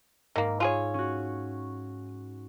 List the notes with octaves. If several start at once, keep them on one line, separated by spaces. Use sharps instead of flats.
G#2 D#3 A#3 E6
F4 G#4 C#5
C#4 F#4